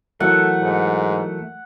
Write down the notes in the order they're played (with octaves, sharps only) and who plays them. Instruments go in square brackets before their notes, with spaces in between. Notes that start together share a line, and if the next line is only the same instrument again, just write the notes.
[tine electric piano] E3 F#3 A#4 [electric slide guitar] A3 [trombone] A4 [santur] F#5
[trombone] G#2